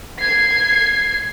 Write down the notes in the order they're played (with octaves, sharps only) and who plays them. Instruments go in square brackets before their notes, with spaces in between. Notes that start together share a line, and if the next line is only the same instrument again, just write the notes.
[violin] G#6 C7